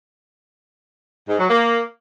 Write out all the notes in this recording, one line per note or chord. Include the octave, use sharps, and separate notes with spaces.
G#2
F#3
A#3